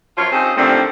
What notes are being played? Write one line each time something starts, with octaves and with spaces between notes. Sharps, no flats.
F#2 F3 F4 A#4 C#5
C4 C#4 D#4 F4 G4 G#4
D3 D#3 F3 G3 A3 C4